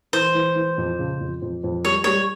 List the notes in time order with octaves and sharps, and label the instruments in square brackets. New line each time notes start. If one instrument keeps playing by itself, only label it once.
[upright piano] E3 [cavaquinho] C5
[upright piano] E3
E3
F2
C#3
F2
F2
F2
[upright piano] G3 [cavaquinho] C#5
[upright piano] G3 [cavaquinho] C#5